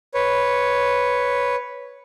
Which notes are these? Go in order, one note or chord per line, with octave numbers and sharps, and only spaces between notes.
B4 C#5